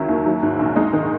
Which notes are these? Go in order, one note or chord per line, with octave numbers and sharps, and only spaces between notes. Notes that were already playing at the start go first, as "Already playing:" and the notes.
Already playing: C#2 D#3 F#3 E4
D#2
F#3
G#2
A#1
G#3 D#4
D#3